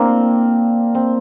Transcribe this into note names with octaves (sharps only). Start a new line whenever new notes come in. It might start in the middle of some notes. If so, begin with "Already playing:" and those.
Already playing: A#3 C4 D4 E4
C4